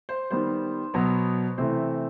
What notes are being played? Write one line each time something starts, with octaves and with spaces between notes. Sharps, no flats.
C5
D#3 G3 B3 C5
B2 F#3 B3
C3 E3 A3 C4 C5